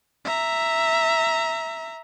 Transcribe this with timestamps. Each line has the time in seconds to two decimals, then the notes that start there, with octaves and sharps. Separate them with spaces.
0.25 E5 A#5